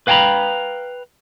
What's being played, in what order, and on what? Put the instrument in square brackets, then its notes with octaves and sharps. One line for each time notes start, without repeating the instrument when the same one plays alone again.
[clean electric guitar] B4 F5 G5 G#5 A#5 B5